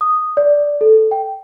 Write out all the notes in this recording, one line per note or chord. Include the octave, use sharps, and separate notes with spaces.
D#6
D5
A4
G5